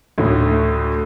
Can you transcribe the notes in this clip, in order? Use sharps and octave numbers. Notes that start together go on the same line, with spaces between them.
D2 A2